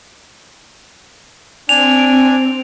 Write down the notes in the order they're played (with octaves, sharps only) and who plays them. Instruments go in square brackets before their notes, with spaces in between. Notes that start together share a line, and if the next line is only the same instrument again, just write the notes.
[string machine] C4 [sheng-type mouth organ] D4 G#5 [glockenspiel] F7
[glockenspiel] D7